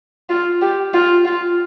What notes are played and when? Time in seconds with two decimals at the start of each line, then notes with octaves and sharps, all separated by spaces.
0.29 F4
0.61 G4
0.93 F4
1.25 F4